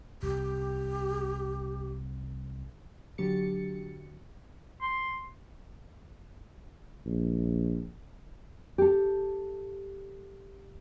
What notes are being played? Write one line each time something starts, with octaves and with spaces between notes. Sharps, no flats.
C2 G4
D3 F#3 G4 A6 C#7
C6
A#1
G4 A4